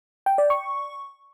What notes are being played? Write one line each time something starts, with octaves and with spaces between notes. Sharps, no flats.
G5
D5
C#6